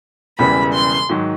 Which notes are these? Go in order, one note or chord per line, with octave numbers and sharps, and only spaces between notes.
E1 E2 C#3 E3 G3 B5
C6
G#2 D#3 F#3